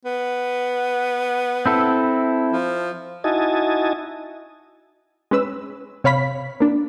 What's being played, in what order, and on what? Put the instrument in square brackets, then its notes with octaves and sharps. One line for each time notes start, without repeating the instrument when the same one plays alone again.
[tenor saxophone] B3
[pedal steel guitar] C4 E4 A4
[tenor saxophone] F3
[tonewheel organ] D#4 E4 F#4 D#5 G#5 A5
[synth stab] G#3 C#4 B4 E6
C3 C#5 F5 B5 B6
A#3 D4